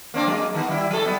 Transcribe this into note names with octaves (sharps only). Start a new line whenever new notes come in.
A#3 C4 D4
F#3 G#3 A#3
D#3 B3
G3 E4
F#3 A4
G3 B3